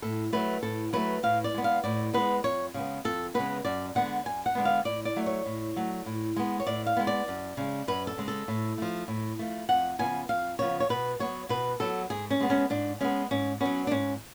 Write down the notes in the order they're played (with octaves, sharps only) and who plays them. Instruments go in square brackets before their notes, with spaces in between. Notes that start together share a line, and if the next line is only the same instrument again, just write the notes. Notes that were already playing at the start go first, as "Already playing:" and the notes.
[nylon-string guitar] A2 A4
F#3 A3 B4
A2 A4
F#3 A3 B4
A2 F5
D5
G#3 B3
F5
A2 D5
G#3 B3 B4
F2 C#5
C#3 G#3 B3
F2 A4
C#3 G#3 B3 B4
F#2 D5
D3 G#3 B3 F#5
F#2 G#5
F#5
D3 G#3 B3
F5
A2 D5
D5
F#3 A3
C#5
A2
F#3 A3
A2
G#3 B3
C#5
A2 D5
F5
G#3 B3
D5
F#2
C#3 G#3
F#2 B4
A4
C#3 G#3
A4
A2
F3 A3
A2
F3 A3
F2 F#5
C#3 F3 B3 G#5
F2 F5
C#3 F3 B3 C#5
C#5
B2 B4
F#3 B3 C#5
B2 B4
F#3 B3 A4
G#2 G#4
C#4
G#3 B3
C#4
G#2 D4
G#3 B3 C#4
G#2 C#4
F#3 B3 C#4
D4
G#2 C#4